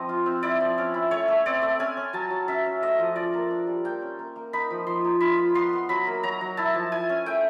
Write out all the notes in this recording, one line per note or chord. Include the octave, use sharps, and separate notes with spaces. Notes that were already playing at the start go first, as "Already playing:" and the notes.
Already playing: F3 C4 D#5
F4
C4
E4 D5
F3
C#4
E4
A3 C#5
A3
C4 D5
A3
C#4 G#5
C#4
F#3 A5
F#3
C#4 E5
C#4
A3 D#5
F3
F4 D5
A#3
D4
G3
A#3 G5
C#4
A#3
A#3
D#4 B5
F3
F3 C6
D#4
F4 B5
F4
B3 C6
B3
F#3 B5
A#3
F#3 A#5
F#3
E4 A5
F3
E4 G#5
C#4
A3 G5